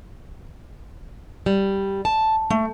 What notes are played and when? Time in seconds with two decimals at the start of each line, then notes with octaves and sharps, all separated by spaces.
1.46 G3
2.05 A5
2.50 A3